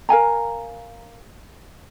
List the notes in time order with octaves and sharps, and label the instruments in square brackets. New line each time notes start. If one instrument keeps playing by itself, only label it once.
[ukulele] A#4 F5 G#5 A#5